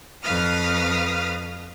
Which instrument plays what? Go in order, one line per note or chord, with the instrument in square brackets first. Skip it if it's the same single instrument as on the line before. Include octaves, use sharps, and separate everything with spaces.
[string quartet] F2 B4 F5 D#6 F6